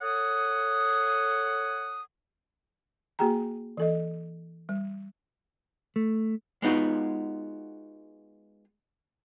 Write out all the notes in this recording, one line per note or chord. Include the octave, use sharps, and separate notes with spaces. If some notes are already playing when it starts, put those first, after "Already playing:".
A4 C#5 F#5 D#6
A#3 F#4 G#4 G5 A#5
E3 A4 D#5
G3
A3
G#3 B3 D#4 F4 F#4